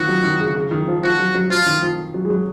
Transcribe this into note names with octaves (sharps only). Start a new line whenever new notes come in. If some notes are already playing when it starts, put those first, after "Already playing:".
Already playing: D#3 F3 F#4
F#3
D#3
C#3
C#3
D#3
F3
F3 F#4
F#3
F#3
F3 F4
D#3
F3
F#3
G#3
F#3